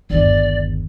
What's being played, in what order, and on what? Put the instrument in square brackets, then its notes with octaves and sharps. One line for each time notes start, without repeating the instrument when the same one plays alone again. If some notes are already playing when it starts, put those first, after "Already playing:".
[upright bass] G1 D#2 [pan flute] D5